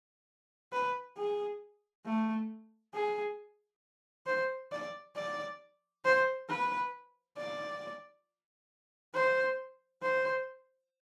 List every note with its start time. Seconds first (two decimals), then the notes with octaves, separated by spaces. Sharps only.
0.72 B4
1.17 G#4
2.06 A3
2.94 G#4
4.27 C5
4.72 D5
5.16 D5
6.05 C5
6.49 B4
7.37 D5
9.14 C5
10.02 C5